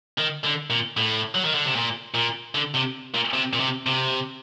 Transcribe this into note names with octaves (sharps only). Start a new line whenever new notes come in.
D#3
D3
A#2
A2
F#3
D#3
D3
C3
A#2
A#2
D3
C3
A#2
C3
A#2
C3
C3